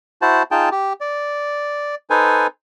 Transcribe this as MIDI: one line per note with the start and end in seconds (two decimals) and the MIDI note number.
0.22 0.43 64
0.22 0.43 66
0.22 0.43 72
0.22 0.43 81
0.51 0.69 63
0.51 0.69 65
0.51 0.69 68
0.51 0.69 79
0.51 0.69 81
0.71 0.93 67
1.01 1.95 74
2.10 2.47 63
2.10 2.47 69
2.10 2.47 71
2.10 2.47 72
2.10 2.47 80